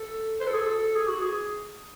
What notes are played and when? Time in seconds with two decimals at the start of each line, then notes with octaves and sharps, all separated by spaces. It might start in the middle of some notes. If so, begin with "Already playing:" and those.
Already playing: A4
0.40 C5
0.47 A4
0.54 G#4
0.62 A4
0.96 G#4
1.08 F#4
1.21 G#4